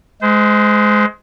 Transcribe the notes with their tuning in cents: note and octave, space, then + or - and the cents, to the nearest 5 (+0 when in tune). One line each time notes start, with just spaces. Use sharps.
G#3 +20 C5 -30